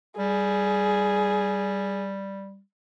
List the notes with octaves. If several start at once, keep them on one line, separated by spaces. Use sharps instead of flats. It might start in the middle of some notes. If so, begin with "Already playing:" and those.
G3 G#4